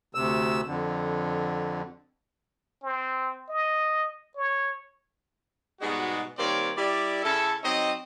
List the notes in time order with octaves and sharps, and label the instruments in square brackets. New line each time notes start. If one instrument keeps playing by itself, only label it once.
[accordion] D2 C3 E6
F2 D3
[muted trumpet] C4
D#5
C#5
[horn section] G#2 B2 G3 G#3 B3 F#4
D#3 G3 A#3 C4 C#5 D5
G3 E4 G4 D5
C#3 C#4 E4 A4
F#3 C4 D#4 C#5 D#5